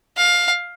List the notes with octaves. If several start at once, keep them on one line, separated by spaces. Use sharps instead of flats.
F5